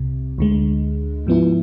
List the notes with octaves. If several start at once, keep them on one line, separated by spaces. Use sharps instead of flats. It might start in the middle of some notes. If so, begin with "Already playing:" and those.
Already playing: C2 C3
D2 D3 G#3
G#2 F3 B3 E4